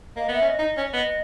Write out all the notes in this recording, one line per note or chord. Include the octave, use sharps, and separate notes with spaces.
A#3 D#5
B3 E5
C#4 E5
D#5
D#4
C#4
B3 D#5